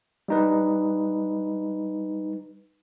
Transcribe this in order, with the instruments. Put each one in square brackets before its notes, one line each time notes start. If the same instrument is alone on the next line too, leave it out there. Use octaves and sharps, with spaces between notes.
[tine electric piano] G3 D#4 B4